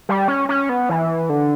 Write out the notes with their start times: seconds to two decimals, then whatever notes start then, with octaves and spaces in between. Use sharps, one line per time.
0.09 G3
0.28 C#4
0.49 C#4
0.69 B3
0.89 E3
1.29 D3